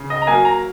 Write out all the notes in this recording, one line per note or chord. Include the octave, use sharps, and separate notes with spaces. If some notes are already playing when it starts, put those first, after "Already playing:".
Already playing: C#3
D#5
A#5
F#3 A#3 G#5
A#5